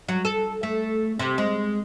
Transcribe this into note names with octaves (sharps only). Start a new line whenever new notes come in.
F#3
A4
A3
C3
G#3